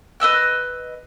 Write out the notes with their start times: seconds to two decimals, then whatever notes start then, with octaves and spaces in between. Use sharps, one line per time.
0.20 B4 D#5 E6 F#6